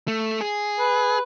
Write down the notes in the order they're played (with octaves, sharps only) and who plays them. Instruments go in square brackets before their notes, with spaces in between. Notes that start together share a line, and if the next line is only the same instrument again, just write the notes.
[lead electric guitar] A3
G#4
[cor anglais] B4